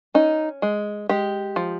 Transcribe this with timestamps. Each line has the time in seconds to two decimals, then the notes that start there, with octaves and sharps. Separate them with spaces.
0.14 C#4 D#4
0.62 G#3
1.09 G#3 G4
1.56 F3